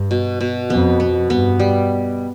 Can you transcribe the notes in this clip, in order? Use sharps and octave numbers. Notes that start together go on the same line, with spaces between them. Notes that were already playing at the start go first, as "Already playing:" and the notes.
Already playing: G2
B2
B2
F2 B3
B3
G2 B3
G3